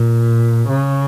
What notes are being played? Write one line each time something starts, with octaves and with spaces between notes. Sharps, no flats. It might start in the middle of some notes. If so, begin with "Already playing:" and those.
Already playing: A#2
C#3